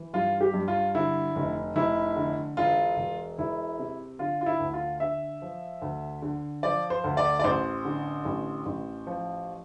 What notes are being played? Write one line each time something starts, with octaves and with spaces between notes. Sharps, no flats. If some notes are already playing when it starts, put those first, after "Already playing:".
Already playing: E3
G2 F4
G4
G2
F4
D3 E4
F1
F1 E4
D3
E1 F4
E1
E1 E4
C3
D3 F4
F4
E4
D2
F4
D3 E5
F3
D2
D3
F3 D5
C5
D2
D5
D5
A1 C5
D3
A1
A1
F3